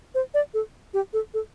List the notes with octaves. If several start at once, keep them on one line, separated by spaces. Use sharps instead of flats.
C5
D5
A4
G4
A4
A4